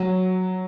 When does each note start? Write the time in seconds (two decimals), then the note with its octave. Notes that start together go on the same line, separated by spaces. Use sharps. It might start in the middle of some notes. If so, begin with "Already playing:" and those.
Already playing: F#3